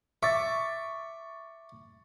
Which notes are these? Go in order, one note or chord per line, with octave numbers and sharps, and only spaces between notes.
E5 C#6 D6 A6